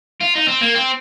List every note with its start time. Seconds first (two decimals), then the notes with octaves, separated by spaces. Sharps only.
0.21 F4
0.35 D#4
0.48 C4
0.61 A#3
0.75 C4